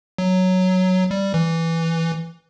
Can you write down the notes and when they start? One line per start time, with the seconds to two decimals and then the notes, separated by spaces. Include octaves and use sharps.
0.18 F#3
1.11 G3
1.34 E3